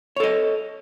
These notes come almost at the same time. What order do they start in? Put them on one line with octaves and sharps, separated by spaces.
C#5 A4 D#5